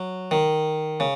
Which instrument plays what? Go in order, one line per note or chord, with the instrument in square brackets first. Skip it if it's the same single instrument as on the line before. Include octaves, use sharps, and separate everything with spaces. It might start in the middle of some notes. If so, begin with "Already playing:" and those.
Already playing: [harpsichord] F#3
D#3
C#3